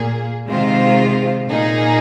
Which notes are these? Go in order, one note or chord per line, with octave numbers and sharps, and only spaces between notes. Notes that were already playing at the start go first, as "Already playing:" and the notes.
Already playing: A#2 A#3 G#4
C3 D#3 G#3 F4 C5
A#2 A#3 D#4 G#4